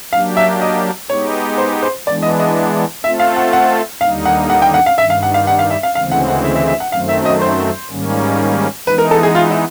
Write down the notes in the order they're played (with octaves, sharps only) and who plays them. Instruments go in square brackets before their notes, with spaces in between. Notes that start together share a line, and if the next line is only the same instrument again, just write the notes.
[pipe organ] F#3 A#3 D4 G4 [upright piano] F5
[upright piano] E5
D#5
[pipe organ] G#3 B3 D#4 G4 [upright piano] C#5
[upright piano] C5
C5
[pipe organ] E3 G#3 B3 D4 [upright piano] D5
[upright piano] D#5
D#5
[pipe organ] A3 C4 F4 A4 [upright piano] E5
[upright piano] F5
F#5
F#5
[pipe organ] D#2 D3 G3 A#3 D#4 [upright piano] F5
[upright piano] F#5
F#5
G5
F#5
F5
[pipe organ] G2 D#3 G3 [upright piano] E5
[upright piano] F5
F#5
F5
F#5
F5
E5
F5
[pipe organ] D2 C#3 E3 G#3 C4 [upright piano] F5
[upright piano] F#5
F#5
E5
E5
E5
F#5
[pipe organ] F#2 D#3 F#3 A3 C4 [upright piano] F5
[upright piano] E5
D#5
C5
[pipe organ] G#2 D#3 G3 A#3 C#4
[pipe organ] E3 G#3 B3 D#4 [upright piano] B4
[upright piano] A#4
A4
G#4
F4
E4